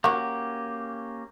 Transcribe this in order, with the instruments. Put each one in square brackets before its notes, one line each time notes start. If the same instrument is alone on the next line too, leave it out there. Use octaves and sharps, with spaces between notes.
[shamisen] F#3 F#4 [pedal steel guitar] A#3 C#4 G4